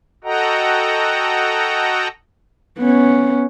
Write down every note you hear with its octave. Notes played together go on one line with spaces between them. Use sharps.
F#4 A4 D#5 F#5 G5 A#5
B3 C#4